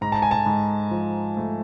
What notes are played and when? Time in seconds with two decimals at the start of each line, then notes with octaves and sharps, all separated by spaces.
0.01 G#2 A#5
0.12 A5
0.22 G#5
0.31 A5
0.46 G#2
0.91 F3
1.37 A3